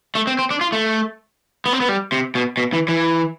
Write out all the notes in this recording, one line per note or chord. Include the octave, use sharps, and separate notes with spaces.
A3
C4
C4
D4
F4
A3
B3
C4
B3
G3
C3
B2
B2
E3
E3